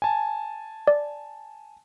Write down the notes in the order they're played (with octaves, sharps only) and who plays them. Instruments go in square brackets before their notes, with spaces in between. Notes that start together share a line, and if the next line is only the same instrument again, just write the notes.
[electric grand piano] G#5 A5
[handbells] D5